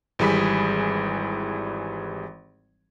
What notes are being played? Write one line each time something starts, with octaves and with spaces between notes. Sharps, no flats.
G#1 E3 G3 G#4 B5 B6